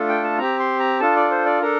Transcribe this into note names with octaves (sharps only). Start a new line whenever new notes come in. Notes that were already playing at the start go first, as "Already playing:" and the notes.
Already playing: A3 D4 F4 A4
G5
A5
C4 G4 A#5
C6
A#5
D4 F4 A4 A5
D5
C5
D5
D4 A4 A#4